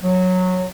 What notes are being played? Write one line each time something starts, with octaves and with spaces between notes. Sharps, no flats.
F#3